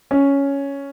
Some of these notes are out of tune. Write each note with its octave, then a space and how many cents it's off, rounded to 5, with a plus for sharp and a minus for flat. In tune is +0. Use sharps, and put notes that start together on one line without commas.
C#4 +5